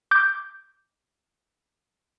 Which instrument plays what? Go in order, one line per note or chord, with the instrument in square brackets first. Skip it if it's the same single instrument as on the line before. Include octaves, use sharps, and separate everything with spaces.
[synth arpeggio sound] D6 G6